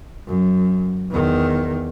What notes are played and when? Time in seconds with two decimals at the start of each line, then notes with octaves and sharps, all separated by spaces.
0.27 F#2
1.10 E2 D#3